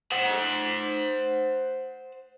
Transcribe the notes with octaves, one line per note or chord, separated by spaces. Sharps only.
C5 F#5